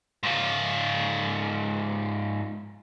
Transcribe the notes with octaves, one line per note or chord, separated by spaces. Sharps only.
G#2 F4